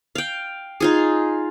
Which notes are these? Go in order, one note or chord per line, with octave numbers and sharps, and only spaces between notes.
F5 G5
D#4 F4 G#4